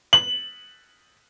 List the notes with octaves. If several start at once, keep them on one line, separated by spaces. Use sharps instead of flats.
F#7